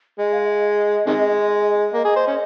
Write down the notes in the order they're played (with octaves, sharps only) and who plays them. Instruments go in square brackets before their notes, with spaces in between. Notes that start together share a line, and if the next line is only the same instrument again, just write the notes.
[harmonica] G#3 [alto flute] D#5
[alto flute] F5
D#5
[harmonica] C3 D#3 G#3
[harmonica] A#3 [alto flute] D#5
[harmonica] G#4
C5
C#4